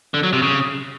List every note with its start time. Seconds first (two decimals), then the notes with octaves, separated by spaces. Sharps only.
0.14 D3
0.23 F#3
0.33 C3
0.42 C#3